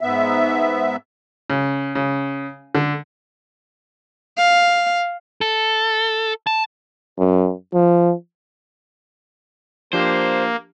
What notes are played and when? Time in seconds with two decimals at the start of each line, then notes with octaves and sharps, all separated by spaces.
0.01 G#2 B3 E5
1.50 C#3
1.95 C#3
2.75 D3
4.38 F5
5.41 A4
6.47 A5
7.18 F#2
7.74 F3
9.93 F3 A#3 D4 G4 C5